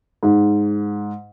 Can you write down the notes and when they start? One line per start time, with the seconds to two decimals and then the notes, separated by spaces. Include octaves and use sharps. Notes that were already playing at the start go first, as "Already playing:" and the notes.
0.23 G#2